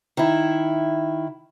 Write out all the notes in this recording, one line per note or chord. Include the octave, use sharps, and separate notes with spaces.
D#3 E4